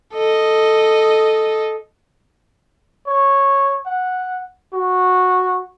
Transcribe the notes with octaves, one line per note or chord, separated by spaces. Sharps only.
A4 D#5
C#5
F#5
F#4